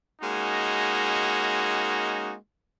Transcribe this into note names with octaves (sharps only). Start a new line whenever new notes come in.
G#3 A#3 C#4 D#4 F#4